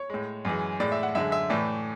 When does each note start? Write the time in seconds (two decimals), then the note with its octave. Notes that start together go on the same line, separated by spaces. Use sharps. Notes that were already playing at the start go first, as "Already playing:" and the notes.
Already playing: C#5
0.10 A2 G#3
0.45 F#2 E3 G#3
0.80 A2 G#3 D5
0.92 E5
1.03 F#5
1.15 F#2 D3 G#3 E5
1.32 E5
1.50 A2 E3 A3 D5